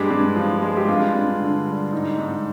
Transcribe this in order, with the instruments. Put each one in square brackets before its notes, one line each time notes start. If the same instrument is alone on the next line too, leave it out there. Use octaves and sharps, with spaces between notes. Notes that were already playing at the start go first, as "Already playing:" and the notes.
Already playing: [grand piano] G2 G#3 G4
G2
F3
G#3
G4
G2 F4
G2
D3
G3
G#2 D#4
G#2